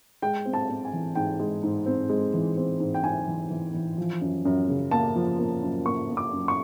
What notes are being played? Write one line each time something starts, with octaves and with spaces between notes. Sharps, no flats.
G#3 G5
C4
A5
C4
G#5
E3
G#2 G5
G#3
G#2
C4
G#3
E3
C4
G#2
G5
G#2 G#5
E3
E3
E3
F3
F#2
F#2
C#3
A#3 A5
F3
A#3
F#2
A#3 C#6
A#3
D6
F#2
C#6